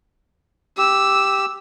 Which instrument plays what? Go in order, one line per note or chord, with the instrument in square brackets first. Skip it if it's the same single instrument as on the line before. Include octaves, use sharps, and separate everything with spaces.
[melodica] G4 [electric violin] E6